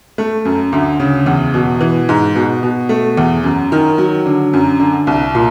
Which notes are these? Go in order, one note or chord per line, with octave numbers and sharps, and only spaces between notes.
A3
F#2
D2
C#3
E2
B2
E3
G#2
B2
B2
A3
E2
F#2
D#3
F#3
D3
F#2
D3
C2
A#2